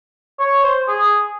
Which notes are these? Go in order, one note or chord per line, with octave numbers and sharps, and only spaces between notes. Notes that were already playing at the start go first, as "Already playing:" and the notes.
C#5
C5
G#4